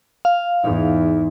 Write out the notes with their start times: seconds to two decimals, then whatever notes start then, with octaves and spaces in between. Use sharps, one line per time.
0.25 F5
0.63 E2 G#2 D#4 E4